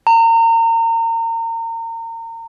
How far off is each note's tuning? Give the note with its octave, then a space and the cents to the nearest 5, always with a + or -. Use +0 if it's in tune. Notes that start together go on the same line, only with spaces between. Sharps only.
A#5 -30